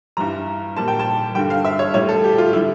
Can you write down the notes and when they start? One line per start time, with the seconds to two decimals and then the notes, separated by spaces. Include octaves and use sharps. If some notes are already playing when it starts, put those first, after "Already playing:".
0.17 G2 E3 G3 A#5
0.77 A#2 G3 A5
0.88 G5
1.00 A5
1.35 G2 D3 G3 G5
1.50 F5
1.65 E5
1.79 C#5
1.94 A2 G3 C#5
2.09 A4
2.24 G4
2.38 F4
2.53 D3 G3 E4